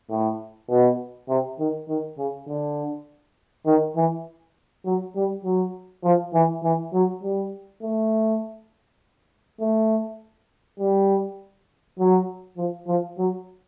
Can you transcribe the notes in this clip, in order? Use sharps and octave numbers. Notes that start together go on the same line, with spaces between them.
A2
B2
C3
D#3
D#3
C#3
D3
D#3
E3
F#3
G3
F#3
F3
E3
E3
F#3
G3
A3
A3
G3
F#3
F3
F3
F#3